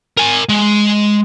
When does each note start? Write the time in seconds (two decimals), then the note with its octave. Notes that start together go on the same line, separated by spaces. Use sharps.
0.17 A#4 G#5
0.49 G#3